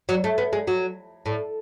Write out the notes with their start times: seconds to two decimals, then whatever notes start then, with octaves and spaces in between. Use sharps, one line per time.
0.09 F#3
0.24 A3
0.38 B3
0.53 G#3
0.67 F#3
1.26 A2